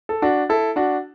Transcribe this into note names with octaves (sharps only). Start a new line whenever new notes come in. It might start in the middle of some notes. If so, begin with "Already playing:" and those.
A4
D4 F#4
E4 A4
D4 F#4